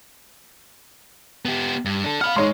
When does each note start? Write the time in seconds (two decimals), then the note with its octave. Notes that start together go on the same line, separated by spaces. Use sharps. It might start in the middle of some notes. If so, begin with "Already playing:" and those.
1.45 B3 G4
1.85 G2
2.04 D4 A4
2.21 F5 F#5 B5 F6
2.36 G#2 G#3 G#4 C#5 C6